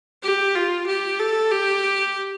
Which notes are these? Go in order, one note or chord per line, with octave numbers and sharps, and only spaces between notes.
G4
F4
G4
A4
G4